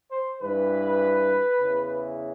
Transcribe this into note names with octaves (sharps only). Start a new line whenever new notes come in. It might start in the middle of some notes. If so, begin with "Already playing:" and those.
C5
G2 E3 B4
E2 C#3 E3